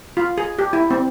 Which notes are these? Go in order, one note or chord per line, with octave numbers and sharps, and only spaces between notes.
F4
G#4
G4
E4
C4